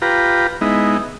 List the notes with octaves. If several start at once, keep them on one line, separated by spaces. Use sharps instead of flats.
F4 G4 B4 A#5
G#3 B3 D#4 E4